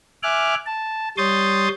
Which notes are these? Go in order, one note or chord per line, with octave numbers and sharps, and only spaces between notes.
E5 G#5 D6 F6 F#6
A5
G3 C#5 C6 D#6 G6 A6